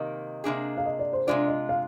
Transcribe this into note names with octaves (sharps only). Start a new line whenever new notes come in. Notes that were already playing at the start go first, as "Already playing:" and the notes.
Already playing: C3 D#3 A#3 D#5
C3 D#3 A#3 D4 G#4
F5
D#5
D5
C5
C3 D#3 G#3 D4 F4 D5
D#5
F5